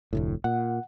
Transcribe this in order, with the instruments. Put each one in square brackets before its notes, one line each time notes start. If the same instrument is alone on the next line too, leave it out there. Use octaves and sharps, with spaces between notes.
[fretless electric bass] F1 D2 A2
[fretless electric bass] A#2 [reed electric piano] F#5